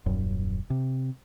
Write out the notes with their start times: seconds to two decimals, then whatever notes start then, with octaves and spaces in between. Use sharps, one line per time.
0.06 D#1 F#2
0.70 C3